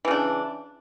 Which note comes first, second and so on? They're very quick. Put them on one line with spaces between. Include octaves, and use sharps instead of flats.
E3 C#3 D4